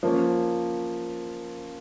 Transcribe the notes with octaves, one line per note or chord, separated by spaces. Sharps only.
F3 A#3 C#4